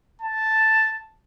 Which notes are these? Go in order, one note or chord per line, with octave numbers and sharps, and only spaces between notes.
A5